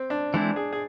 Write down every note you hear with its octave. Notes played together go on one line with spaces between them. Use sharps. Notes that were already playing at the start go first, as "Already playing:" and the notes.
Already playing: C4
D4
E3 G#3 C4 D4 E4
G#4
G#4